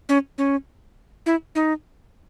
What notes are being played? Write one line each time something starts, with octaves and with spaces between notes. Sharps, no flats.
C#4
C#4
E4
D#4